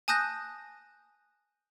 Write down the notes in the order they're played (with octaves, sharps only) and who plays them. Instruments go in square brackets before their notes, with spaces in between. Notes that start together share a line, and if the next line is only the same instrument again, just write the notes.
[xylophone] G#5 A5 D#6 F#6 G6 A#6